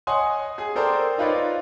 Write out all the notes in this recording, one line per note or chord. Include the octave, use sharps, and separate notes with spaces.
C#5 D#5 F#5 G#5 C6 D#6
G#4 G#5
A4 A#4 C5 D5 G5
D#4 F4 B4 C#5 D5